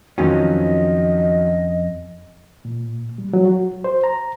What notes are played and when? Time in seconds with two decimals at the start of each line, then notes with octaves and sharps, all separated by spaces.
0.18 F2 D#3 F3 F#3 C#4 D#5
2.65 A#2
3.18 G3
3.33 F#3
3.46 F#4
3.84 C5
4.04 A#5